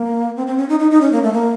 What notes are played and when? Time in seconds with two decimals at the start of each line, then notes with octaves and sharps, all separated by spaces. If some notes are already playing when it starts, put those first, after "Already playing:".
Already playing: A#3
0.37 C4
0.47 C4
0.58 C#4
0.69 D#4
0.80 D#4
0.91 D#4
1.01 C#4
1.13 A#3
1.23 A3
1.33 A#3